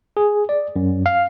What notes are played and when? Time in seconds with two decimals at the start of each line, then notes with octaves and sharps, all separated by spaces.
0.17 G#4
0.49 D5
0.76 F#2
1.06 F5